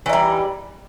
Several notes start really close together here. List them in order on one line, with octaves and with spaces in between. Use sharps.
E3 D#4 G3